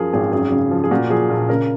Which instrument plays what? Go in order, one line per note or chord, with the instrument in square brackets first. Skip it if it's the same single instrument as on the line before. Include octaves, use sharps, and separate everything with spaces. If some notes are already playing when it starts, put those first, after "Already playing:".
Already playing: [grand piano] F#2 F3 G#4 A#4
G#1 G#4
F#2 G#4
C#3
F3
G#4
A#2 F#4
F3 G#4
A#1
C#3 A#4